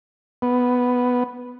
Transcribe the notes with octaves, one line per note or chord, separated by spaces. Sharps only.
B3